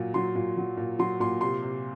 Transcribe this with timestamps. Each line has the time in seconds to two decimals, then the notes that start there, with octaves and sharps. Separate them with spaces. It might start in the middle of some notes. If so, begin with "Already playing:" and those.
Already playing: A#2 F#3
0.14 F#3 C6
0.35 A#2
0.57 F#3
0.77 A#2
0.99 F#3 C6
1.20 A#2 C6
1.41 C3 C6
1.62 C3